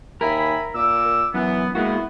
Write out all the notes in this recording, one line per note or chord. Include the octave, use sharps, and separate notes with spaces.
D#2 A#4 E5 G#5 B5
A#2 D6 E6
F#2 E3 B3
G#3 A#3 B3 E4 F#4